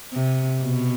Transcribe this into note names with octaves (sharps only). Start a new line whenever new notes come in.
C3
B2